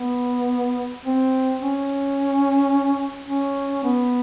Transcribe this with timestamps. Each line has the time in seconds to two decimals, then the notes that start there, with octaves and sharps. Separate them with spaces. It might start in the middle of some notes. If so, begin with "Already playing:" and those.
Already playing: B3
1.06 C4
1.61 C#4
3.29 C#4
3.84 B3